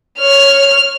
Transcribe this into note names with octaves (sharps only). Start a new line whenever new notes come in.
C#5 F6